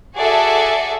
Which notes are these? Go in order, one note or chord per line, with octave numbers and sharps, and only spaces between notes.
F#4 G#4 A4 D5 E5